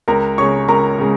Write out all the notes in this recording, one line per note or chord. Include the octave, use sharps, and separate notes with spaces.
C#2 A#4 A#5
C#3 G#3 C#5 C#6
C#2 A#4 A#5
C#3 G#3